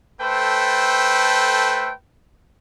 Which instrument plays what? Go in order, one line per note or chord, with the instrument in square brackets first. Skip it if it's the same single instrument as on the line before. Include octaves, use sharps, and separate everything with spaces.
[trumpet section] A3 A4 B4 C5 G5